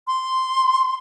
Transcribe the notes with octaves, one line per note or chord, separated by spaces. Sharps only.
C6